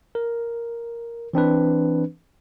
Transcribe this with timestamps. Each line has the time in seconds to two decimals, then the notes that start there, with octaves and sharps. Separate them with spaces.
0.15 A#4
1.33 E3 C4 D4 B4